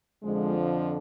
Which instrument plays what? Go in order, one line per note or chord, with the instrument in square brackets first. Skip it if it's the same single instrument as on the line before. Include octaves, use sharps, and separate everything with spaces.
[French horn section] F2 D3 F3 G#3